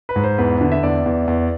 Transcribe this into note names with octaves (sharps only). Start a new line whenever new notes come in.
B4
G#2
C5
E2 B4
D3
E5
E2 D5
E2
E2